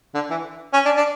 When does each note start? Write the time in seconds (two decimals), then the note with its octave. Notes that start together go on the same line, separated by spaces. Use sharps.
0.15 D3
0.30 E3
0.73 C#4
0.85 D4
0.97 D4